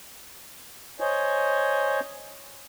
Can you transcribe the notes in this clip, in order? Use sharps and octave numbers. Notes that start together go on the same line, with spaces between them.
C5 C#5 D#5 G#5